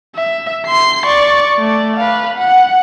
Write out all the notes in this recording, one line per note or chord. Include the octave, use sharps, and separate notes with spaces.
E5
C6 C7
D5 C#6
A3 D5
B4 F5
F#5